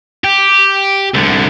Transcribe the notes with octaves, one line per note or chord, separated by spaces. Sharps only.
G4
C2 D3